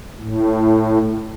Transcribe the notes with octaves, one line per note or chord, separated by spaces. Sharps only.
A2